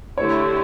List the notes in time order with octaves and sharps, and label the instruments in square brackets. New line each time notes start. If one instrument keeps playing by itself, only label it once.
[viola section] D3 A3 E4 G4 [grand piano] C#5